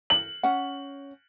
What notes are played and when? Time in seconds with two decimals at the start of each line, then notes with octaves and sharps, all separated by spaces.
0.10 F#7
0.43 C#4 F#5